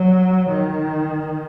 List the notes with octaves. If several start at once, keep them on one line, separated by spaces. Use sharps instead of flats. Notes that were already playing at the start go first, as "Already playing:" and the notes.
Already playing: F#3
D#3